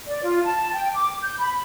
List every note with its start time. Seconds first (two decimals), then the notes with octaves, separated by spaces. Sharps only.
0.08 D5
0.23 F4
0.44 A5
0.73 G5
0.94 D6
1.22 G6
1.39 B5